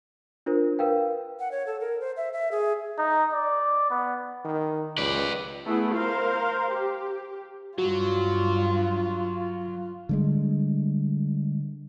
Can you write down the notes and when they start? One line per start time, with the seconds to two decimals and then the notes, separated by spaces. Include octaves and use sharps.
0.46 D4 F4 A#4 C5
0.79 A#4 B4 F5 G5
1.40 F#5
1.51 C#5
1.67 A4
1.80 A#4
2.00 C5
2.17 E5
2.33 E5
2.52 G#4
2.98 D#4
3.33 D5
3.90 B3
4.45 D#3
4.98 C#2 B4 D5
5.65 A3 B3 E4 G#4
5.95 A#4 C5 F5
6.72 G4
7.78 G2 F#3 F4 F#4
10.09 D3 G3 G#3